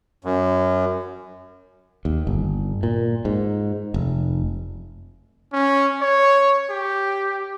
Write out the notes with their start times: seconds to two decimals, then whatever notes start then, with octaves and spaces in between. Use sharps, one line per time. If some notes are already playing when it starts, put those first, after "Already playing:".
0.25 F#2
2.05 D#2
2.27 G1
2.83 A#2
3.25 G#2
3.94 F1
5.53 C#4
6.01 C#5
6.70 G4